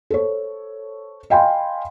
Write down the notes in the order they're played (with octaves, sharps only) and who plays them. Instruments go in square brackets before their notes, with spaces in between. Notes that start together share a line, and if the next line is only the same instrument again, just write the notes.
[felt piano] A4 C5 C#5
D#5 F5 G5 G#5 B5 C6